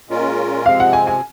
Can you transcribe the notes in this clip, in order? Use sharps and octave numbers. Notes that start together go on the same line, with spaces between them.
A#2 G#3 C#4 F4 A#4
C3 F3 G#3 C4 F5
F#5
G#5
G#5